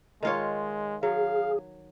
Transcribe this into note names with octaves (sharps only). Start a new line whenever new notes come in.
D#3 G#3 F4 C#5
F#3 G#4 F5